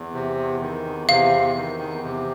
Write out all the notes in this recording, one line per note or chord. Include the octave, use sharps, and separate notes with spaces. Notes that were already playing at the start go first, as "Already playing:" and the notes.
Already playing: E2
C3
E2
D#3
E2
C3 F5
E2
D#3
E2
C3